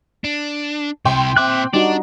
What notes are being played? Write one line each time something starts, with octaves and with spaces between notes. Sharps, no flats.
D4
C3 E4 G5 C6
A#2 C4 E5 D6 F#6
G3 D4 D#4 F#4 D5